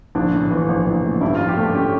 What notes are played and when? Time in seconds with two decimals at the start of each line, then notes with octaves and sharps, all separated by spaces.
0.15 A#1 D4
0.34 A2
0.51 E3
0.69 A#1
0.86 A#1
1.04 A2
1.21 G2 E4
1.35 F4
1.39 F3
1.48 G4
1.57 A3 A4
1.75 C#4 G4